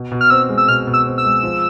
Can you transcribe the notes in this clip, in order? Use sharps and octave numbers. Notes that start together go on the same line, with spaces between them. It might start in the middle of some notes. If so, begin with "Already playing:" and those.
Already playing: B2
B2
F6
C4 E6
G#3
E6
B2 F6
B2
E6
C4
E6
G#3
F3